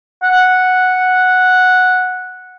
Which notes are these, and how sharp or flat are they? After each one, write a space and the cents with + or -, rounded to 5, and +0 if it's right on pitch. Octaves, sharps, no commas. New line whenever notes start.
F#5 -5